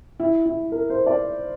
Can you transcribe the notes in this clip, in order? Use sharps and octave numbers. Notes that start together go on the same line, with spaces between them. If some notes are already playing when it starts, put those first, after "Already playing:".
E4
E4
A#4
C5
D5